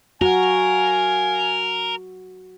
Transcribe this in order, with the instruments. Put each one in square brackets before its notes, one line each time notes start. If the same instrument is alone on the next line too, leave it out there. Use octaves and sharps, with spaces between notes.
[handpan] F#4 [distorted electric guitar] A#4 [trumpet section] F5 G#5